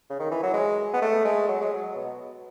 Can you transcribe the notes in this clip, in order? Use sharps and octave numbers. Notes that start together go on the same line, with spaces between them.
C#3
D#3
E3
F#3
G#3
B3
A3
G#3
F#3
G#3
F#3
B2